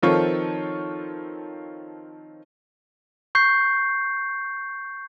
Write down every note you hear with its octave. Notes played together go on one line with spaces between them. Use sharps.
D#3 F3 C4 F4 A4 C#5
C#6 G6 C7